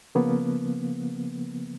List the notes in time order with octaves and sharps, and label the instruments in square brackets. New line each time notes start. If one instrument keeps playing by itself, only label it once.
[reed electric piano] C#3 F3 A#3 B3